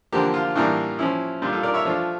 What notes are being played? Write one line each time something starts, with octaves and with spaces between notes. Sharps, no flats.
D3 F3 A#3 G4
F4
A2 E3 G3 A#3 D4
F3 C#4 E4
A#2 G3 D4 F4
F4 A4
A#4 D5
C#5 E5
F3 A3 D4 F4